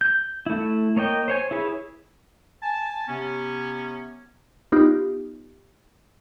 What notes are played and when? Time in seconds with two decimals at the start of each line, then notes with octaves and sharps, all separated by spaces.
0.01 G6
0.46 A3 E4
0.97 A#3 C#5 D#5 G5
1.28 C5 C#5 G#5
1.51 E4 G#4 B4 C#5
2.62 G#5 A5
3.08 C3 B3 C#4
4.72 B3 D#4 F4 G4